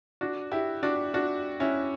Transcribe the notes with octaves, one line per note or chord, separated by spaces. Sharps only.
D4 F#4
E4 G4
D4 F#4
D4 F#4
C#4 E4